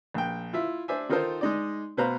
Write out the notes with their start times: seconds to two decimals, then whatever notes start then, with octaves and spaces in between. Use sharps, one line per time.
0.14 A#1 G5
0.53 E4 F4 E5
0.88 D4 C5 D5 E5 G#5
1.09 D#3 D#4 F4 A4 A#4 C5
1.41 G#3 D#4 D5
1.97 B2 B4 C5 F5 A#5